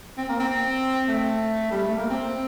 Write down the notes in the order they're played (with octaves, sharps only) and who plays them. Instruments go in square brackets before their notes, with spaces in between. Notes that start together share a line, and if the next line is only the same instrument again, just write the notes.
[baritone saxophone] C4
A#3
C4
A3
G3
A3
A#3
C4